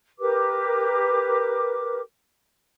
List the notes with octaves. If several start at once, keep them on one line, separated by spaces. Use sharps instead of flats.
G4 A#4 B4 D6